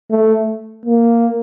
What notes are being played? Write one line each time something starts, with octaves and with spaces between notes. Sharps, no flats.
A3
A#3